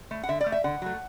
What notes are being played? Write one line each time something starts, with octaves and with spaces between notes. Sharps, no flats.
A3
F#5
D3 E5
D5
A3
E5
D3 F#5
F#3 A3